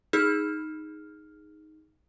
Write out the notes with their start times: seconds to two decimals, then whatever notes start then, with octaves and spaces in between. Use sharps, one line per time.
0.13 D#4 G#4 F6